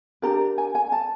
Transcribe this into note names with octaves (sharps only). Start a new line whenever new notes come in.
D4 G4 A#4 A#5
G#5
G#5
A5